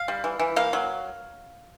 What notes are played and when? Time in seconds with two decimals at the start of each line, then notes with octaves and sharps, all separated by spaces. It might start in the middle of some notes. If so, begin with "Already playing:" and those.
Already playing: F5
0.08 G3
0.24 E3
0.39 E3
0.56 A#3 F5
0.73 F#3